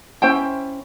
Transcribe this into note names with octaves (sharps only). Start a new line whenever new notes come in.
C#4 E4 C5 G5